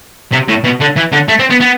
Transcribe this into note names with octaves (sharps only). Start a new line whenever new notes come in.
C3
A2
B2
D3
E3
D3
A3
C4
B3
B3